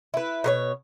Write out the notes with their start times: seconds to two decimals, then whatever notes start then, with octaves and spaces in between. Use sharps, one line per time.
0.14 E4 B4
0.44 B2 A#4 C#5